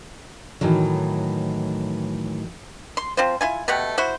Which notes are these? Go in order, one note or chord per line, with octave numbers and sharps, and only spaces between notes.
A2 D#3 E3 F#3
C6
F3 C4 F4 C5
E4 F4 G#5
B2 A3 G4 F#5
E4 F#4 C5